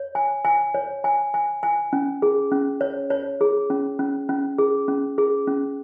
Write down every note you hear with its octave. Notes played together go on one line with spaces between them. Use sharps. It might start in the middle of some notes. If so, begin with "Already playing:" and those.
Already playing: C#5
G#5
G#5
C#5
G#5
G#5
G#5
C#4
G#4
C#4
C#5
C#5
G#4
C#4
C#4
C#4
G#4
C#4
G#4
C#4